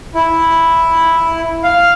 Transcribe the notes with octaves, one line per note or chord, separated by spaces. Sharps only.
E4
F5